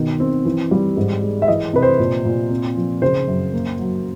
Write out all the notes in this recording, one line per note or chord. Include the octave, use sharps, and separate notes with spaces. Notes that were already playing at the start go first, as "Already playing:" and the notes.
Already playing: B2 D#3
C4
E3
G3
G#2
G#3
E5
E3 D#5
C3 B4
C5
A#2
A#2
C4
F3
C#3 C5
F#2
A#3
F#3